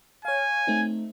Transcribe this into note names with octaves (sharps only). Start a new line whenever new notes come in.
C#5 F5 G#5
A3 C4 D#4